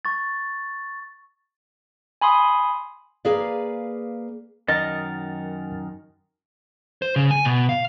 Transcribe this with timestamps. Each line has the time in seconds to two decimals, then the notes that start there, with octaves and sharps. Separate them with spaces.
0.05 C#6 A6
2.21 G#5 B5 C6 D#6
3.25 A#3 G#4 B4 D5 F5
4.68 F#2 D#3 A#4 D#5 A6
7.02 C5
7.16 C#3
7.31 G#5
7.45 B2
7.69 F5